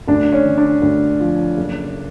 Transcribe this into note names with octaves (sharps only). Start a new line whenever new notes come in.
D2 D4
C#4
D3
D4
D2
F3
F#1